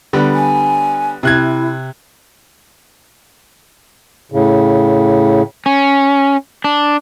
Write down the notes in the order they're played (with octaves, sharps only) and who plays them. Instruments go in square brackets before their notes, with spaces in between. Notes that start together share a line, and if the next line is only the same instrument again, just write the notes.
[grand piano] D3 G3 B3
[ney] G#5
[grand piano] C3 F#6 G#6 [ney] E4
[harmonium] A2 C#3
[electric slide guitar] C#4
D4